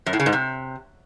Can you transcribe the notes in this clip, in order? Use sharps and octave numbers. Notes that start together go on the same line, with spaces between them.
F#2
A2
C#3
G#2
C3